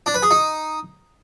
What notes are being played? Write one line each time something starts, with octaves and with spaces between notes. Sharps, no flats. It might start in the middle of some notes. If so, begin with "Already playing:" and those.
D4
B4
G#4
D#4